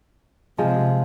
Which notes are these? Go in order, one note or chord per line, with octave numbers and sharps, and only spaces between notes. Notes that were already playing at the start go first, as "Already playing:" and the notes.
C3 F3 G#3